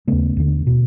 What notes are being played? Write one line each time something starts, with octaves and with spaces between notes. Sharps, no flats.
D#2 C#3 A3 B3
D#2 D3
B2